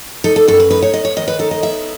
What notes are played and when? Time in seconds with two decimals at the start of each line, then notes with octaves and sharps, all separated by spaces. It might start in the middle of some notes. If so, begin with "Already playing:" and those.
0.24 D#4 A4
0.36 A4
0.48 F#2 A4
0.60 B4
0.70 D#4 B4
0.82 C#5
0.93 B3 D#5
1.05 C#5
1.16 D#3 D#5
1.28 B4
1.39 D#4 A4
1.51 D#5
1.63 B3 E5